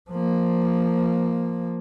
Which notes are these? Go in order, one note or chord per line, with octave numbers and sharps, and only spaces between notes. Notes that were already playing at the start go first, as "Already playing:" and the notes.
F3 A#3